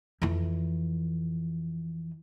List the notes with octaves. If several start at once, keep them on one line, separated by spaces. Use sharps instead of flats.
F2 E3